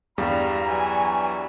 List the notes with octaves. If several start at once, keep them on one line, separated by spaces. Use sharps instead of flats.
E2 G2 G3 F5 A#5
E3 F#3 G#5